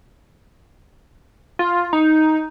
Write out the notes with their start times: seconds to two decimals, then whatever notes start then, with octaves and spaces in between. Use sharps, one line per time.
1.59 F4
1.93 D#4